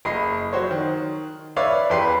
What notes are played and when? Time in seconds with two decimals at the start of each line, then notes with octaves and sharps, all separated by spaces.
0.05 F#1 D#5 B5 C7
0.53 F#3 F#4 C5 C#5
0.71 D#3
1.56 B4 C#5 D5 E5 F5
1.90 E2 G4 B4 C6 C7